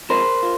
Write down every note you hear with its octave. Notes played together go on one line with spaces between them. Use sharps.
C3 F3 G#3 A#4 C5
F4